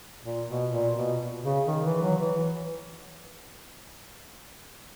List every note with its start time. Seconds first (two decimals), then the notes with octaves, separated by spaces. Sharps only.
0.24 A#2
0.49 B2
0.72 A#2
0.96 B2
1.43 C#3
1.67 D#3
1.85 E3
2.02 F#3
2.20 E3